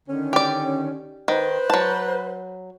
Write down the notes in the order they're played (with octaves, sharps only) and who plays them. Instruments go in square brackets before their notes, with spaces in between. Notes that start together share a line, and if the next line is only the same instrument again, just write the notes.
[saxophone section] D3 D#3 C#4
[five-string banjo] G4 D5
[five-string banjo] D#3 [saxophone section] B4 C5
[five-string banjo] F#3 A5